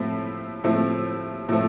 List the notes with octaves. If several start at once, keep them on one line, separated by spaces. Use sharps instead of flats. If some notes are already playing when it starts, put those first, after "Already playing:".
Already playing: A2 F3 A3 C4
A2 F3 A3 C4
A2 F3 A3 C4